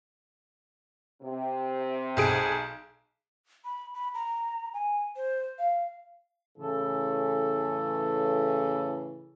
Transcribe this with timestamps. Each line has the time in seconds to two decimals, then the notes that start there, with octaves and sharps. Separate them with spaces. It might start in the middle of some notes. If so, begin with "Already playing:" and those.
1.21 C3
2.17 B1 G#4 D7
3.65 B5
3.94 B5
4.14 A#5
4.74 G#5
5.16 C5
5.59 F5
6.58 A2 C#3 E3 A4